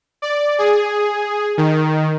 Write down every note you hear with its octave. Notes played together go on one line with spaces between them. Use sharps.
D5
G#4
D#3